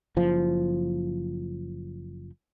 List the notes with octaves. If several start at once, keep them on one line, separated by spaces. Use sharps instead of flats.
F#1 F3